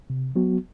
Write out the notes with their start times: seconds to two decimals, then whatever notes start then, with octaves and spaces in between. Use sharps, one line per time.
0.10 C3
0.36 F#3 B3 F#4